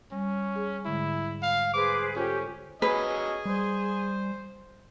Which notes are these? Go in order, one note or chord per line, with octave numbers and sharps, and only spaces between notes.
G3 C#4
G#4
G#2 D3 G#3 E4
F5
G#4 B4 C5 D6
C#4 F4 G4 A4 C5
F#3 C#4 G#4 B4 D#5
G3 C5